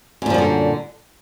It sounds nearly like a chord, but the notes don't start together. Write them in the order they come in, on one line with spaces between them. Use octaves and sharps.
F#2 A#2 F3 G3 D3